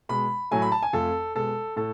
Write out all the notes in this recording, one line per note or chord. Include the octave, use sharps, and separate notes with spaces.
B2 G#3 B5
A2 F#3 A3 G#5
B5
A5
G#5
F2 F3 A3 A4
B2 G#3 A4
A2 A4